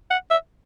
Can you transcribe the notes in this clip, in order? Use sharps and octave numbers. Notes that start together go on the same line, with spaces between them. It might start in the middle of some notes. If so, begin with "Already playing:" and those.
F#5
E5